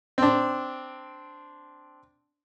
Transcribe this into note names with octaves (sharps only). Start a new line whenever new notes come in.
C4 D4